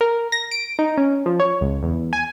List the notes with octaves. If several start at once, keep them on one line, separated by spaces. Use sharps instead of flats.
A#4
A#6
D7
D#4
C#4
F3
C#5
C#2
E2
G#5